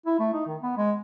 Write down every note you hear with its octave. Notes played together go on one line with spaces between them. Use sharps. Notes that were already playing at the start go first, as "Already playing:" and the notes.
E4
A3
D#4
D#3
B3
G#3